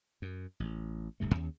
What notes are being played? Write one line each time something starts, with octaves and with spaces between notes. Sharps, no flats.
F#2
A1
D1 G2 C3 A3
D#2 C#4